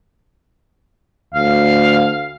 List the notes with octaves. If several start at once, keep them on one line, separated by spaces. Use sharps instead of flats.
D2 F5